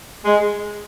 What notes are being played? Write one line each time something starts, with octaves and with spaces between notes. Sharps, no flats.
G#3